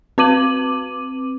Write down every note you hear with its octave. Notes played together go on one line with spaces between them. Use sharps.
C4 B4 D6 D#7 F#7